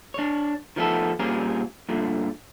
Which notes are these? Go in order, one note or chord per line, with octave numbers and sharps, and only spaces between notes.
D4 C#5
D#3 F3 A3 B3 A4
A#2 G3 C4 C#4 G#4 A#4
G2 A#2 D3 A3